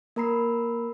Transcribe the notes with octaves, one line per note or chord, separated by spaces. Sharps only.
A#3 A#4 A#5 B5 C7